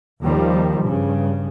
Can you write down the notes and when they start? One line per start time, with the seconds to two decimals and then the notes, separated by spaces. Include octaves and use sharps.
0.22 D#2 D#3 F3 G3
0.81 G2 C#3